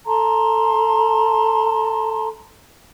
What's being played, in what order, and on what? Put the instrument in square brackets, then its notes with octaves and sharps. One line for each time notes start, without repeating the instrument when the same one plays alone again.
[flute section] A4 A5 A#5 C6